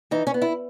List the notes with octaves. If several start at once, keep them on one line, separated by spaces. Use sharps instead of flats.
E3 D#4
C#4
B3
E4